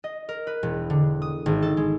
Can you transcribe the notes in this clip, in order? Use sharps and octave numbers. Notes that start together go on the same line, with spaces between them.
D#5
A#4
B4
E1
D3
D#6
G#1
A4
G#3